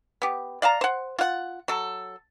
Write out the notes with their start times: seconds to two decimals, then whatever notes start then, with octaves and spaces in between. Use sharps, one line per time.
0.22 B3 G4
0.62 D5 F5 A5 A#5
0.81 C5 F#5
1.19 F4 F#5
1.68 F#3 A4